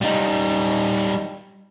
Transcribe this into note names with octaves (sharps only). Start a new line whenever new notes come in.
G3 D#4